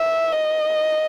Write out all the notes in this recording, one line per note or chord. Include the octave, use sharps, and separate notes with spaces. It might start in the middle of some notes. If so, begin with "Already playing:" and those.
Already playing: E5
D#5